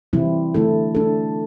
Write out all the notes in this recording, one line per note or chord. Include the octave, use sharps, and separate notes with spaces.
C3 E3 G3 C4 E4
D3 A3 E4 A4
A3 D4 A4